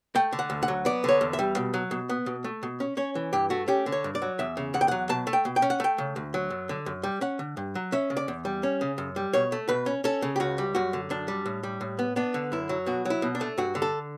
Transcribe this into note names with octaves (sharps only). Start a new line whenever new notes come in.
A3 G5
D3
F#5
D2
F#5
F#3
B3 D5
D3 C#5
E2
E5
G3
B2
F#3
B2
B3
B2
A3
B2
C#4
C#4 C#5
E3
G2 G4
A3 F#4
C#4 G4
D3
C#5
G2
D5
F#3
E2 E5
C#3
E2 F#5
G5
F#3 F#5
B2 A5
A3
G5
B2
G5
C#4
F#5
A3 G5
C#3
D2
F#3
F#2
D3
F#2
G3
C#4 F#5
D3
G2
F#3
C#4 E5
C#3
D5
E2
G3
C#4
C#3
F#2
G3
B2 C#5
A3
B2 B4
C#4
C#4 A4
C#3
G4
C#2 F#4
G3
F#2 F#4
D3
F#2 D4
G3
A2
G3
A2
B3
B3 D4
D3
F#2 E4
F#3
B2 F#4
F#3 E4
B2
D4
A3
G2 F#4
D3
A4